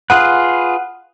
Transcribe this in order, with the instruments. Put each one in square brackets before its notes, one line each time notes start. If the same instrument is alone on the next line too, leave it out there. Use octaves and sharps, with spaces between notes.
[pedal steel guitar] F4 G#4 B4 [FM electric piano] F#5